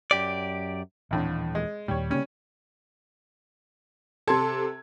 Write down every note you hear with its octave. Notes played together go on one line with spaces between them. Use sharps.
F#2 G4 D5
D#1 F2 A2 D3 E3
G#3
D#2 A#2 G3 C#5
C#3 G3 A#3 C#4
C3 A4 A5 C6 G#6